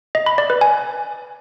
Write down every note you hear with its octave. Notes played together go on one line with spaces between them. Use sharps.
D#5
B5
D5
B4
G#5